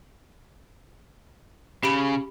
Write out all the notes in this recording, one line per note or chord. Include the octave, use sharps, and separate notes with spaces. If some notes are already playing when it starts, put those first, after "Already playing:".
C#3 G4 B5 D7